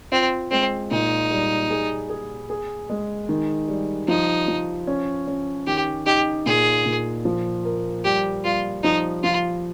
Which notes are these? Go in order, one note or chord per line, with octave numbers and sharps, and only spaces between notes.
C4 F4
G#3 C4
A#2 D#4
G3
G#4
G#4
G#4
G#3
D#3
G3
F3 D#4
F3
C#4
C#4
D#3 G4
D#4 G4
A#2 G#4
A#2
F3
A#4
G3 G4
G3 F4
F3 D#4
F3 F4